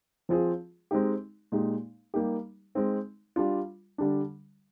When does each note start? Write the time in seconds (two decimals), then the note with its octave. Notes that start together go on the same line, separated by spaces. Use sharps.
0.29 F3 C4 F4 G#4
0.91 G#3 C4 D#4 G4
1.52 A#2 G#3 D#4 G4
2.14 G3 A#3 D#4 G4
2.75 G#3 C4 D#4
3.36 G3 D4 F4
3.98 D3 G3 D4